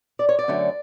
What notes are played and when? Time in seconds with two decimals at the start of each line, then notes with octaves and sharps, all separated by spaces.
0.19 D5
0.29 C#5
0.39 D5
0.48 F#2 D3 F#3 A3